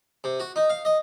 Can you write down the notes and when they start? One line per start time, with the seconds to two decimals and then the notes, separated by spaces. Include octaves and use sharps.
0.24 C3
0.40 F#4
0.56 D#4
0.70 F5
0.85 D#5